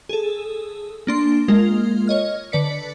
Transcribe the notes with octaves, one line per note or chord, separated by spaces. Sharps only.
G#4 A4
A#3 D4 C6
G#3 A#3 F4 A#4
C#5 D#5 F6
D3 B4 D5 B6 C#7